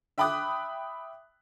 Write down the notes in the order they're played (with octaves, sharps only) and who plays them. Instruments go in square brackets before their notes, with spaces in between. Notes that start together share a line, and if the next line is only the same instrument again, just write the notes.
[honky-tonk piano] E5 G5 B5 D6 D#6 F#6